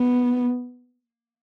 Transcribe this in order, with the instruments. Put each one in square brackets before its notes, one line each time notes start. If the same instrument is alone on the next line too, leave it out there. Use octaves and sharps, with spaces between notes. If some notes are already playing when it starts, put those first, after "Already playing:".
Already playing: [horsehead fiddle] B3